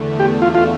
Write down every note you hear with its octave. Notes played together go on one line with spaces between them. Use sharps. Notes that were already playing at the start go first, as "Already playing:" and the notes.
Already playing: E2 D3 A3
G4
F4
F4